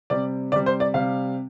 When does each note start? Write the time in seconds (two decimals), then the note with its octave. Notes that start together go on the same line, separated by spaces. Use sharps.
0.10 C3 G3 D5
0.52 C3 D5
0.56 G3
0.66 C5
0.80 D5
0.94 C3 G3 F5